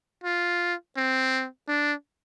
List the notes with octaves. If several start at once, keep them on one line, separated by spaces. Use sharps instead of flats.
F4
C4
D4